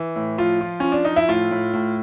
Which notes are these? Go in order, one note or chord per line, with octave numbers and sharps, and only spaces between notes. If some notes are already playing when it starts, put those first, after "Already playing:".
Already playing: E3
A2
F3 F4
F3
F3 C#4
D4
F3 D#4
E4
A2 F4
A2
A2